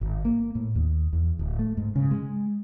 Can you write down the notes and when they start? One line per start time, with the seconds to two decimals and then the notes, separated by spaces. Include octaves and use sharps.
0.01 G#1
0.25 A#3
0.55 A2
0.75 D#2
1.13 E2
1.39 D1
1.59 A3
1.77 G#2
1.96 C#3
2.11 G#3